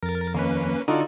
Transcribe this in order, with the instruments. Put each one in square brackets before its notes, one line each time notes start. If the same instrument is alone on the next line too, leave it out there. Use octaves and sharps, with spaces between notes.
[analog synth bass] F2 [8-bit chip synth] A#4 A6
[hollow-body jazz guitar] D#2 [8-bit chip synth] A#3 C#4 B4
[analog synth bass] D3 [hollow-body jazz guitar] D#4 F4 [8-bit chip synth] F#4 A4 D5